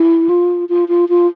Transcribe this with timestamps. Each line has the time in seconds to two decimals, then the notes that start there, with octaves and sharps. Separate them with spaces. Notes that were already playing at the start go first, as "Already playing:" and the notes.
Already playing: E4
0.29 F4
0.69 F4
0.88 F4
1.09 F4